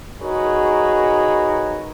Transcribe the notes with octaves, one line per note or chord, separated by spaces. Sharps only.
D#4 F#4 G#4 A#4 B4 C#5